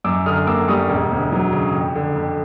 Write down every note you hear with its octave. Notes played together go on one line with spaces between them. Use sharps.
F#2 D6 E6
D3 D#6 F6
A#3 D6 E6
G3 C#6 D#6
E1
D2
F#3
C#3
F2
D3
F2